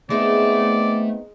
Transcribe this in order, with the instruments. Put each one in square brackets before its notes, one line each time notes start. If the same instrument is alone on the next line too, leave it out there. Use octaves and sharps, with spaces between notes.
[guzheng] G#3 [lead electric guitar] A3 E5 [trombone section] B3 C4 D#4 [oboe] D5